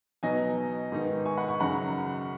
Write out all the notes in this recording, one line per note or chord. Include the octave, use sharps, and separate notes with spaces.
B2 F#3 B3 D#4 D#5 G#5
G#2 D#3 B3 D#4
G#5 C#6
F#5 B5
G#5 C#6
F#2 C#3 F#3 D#4 F#5 B5